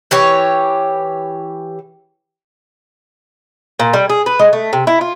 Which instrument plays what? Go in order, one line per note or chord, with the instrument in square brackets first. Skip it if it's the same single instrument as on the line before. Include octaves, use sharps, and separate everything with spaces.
[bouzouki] E3 G4 C#5
A#2
G3
G#4
B4
G#3
A3
C3
E4
F4